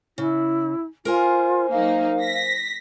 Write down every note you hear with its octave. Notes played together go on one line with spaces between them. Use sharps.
C#3 E4
F4 A#4 C5 G#5
F#3 A#3 D#4 F5
A#6 B6